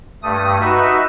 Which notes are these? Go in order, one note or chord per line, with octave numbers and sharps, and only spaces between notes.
G2 A3 D#6
D#4 F#4 B4 E5